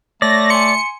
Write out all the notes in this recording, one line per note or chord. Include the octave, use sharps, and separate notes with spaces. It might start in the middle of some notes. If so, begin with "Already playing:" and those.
A3 C#5 D5 A#6
G#5 C6 C#7